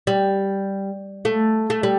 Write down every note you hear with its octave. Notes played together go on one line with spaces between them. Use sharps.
G3
A3
A3
G3